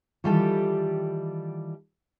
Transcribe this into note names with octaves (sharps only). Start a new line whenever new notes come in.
D#3 E3 G3 F4 G4 A4